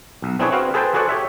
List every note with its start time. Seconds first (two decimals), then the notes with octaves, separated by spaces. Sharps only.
0.22 B1
0.39 C4 D4 E4 G#4 B4 C#5
0.52 C4 F#4 B4 F5
0.74 G#4 A4 B4 C5 G5 A5
0.94 F#4 G#4 A4 C5 D5 F#5
1.09 G4 C#5 E5